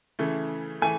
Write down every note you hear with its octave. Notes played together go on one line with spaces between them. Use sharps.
C#3 E3 A3
E3 A3 G#5